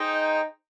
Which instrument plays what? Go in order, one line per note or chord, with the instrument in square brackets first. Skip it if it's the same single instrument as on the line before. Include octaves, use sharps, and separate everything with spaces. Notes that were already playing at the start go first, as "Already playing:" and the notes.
Already playing: [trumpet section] D#4 [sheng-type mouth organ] G#4 C5 G5